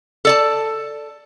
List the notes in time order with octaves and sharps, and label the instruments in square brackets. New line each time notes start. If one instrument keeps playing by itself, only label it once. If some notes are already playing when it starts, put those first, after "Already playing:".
[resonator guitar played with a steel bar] A4 D5 A5